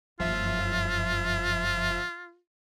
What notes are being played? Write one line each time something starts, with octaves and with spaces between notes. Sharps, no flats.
F#1 G2 F3 F4 E5